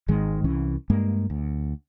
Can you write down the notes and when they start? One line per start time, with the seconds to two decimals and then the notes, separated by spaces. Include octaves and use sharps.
0.08 G#1 G#2 D#3 G#3
0.44 C2 E3 C#4
0.90 G2 G#3 A#3
1.30 D2